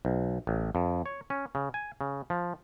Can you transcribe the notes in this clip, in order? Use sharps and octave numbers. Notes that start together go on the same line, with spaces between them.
B1
A1
F2
C#5
C#4
C#3
G#5
C#3
F3